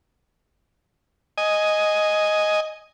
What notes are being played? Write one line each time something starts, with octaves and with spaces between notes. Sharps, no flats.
D#5 G#5